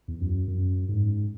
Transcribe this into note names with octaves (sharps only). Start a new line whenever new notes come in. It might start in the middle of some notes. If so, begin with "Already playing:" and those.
E2
F#2
F#2
G#2